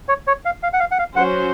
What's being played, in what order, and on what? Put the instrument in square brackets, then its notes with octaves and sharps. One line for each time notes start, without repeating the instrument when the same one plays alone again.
[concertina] C#5
C#5
F5
F5
F#5
F5
F#5
F5
[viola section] F#3 C#4 F#4 C5 [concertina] F#5